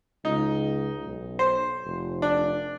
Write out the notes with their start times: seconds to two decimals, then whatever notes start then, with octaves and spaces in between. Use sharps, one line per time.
0.25 C#2 D#4
1.06 B1
1.39 C5
1.85 F1
2.22 D4